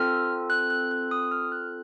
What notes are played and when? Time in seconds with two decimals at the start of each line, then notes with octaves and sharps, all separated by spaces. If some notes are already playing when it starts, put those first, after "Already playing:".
Already playing: C4 F4 A4 F6
0.50 F#6
0.70 F#6
0.91 F#6
1.11 D#6
1.31 F6
1.52 F#6